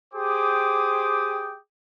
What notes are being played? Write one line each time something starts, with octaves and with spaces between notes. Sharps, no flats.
G4 G#4 C5 G5 D6 D#6